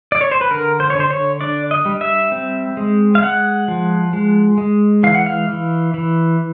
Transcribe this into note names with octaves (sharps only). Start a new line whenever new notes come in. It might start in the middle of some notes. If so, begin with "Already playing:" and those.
D5
C#5
C5
B4
D3 A#4
C5
C#5
D3
C5
C#5
D4 D5
D#5
G3
E5
C4
G#3
F5
G#3 F#5
F3
G#3
G#3
E3 F5
F#5
F5
E3
E3